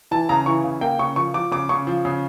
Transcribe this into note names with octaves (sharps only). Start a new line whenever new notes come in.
E3 A5
C#3 A#5
E3 C#6
C#3
A#3 G5
C#3 C#6
F3 C#6
F3 D6
C#3 D6
C#3 C#6
F3
C#3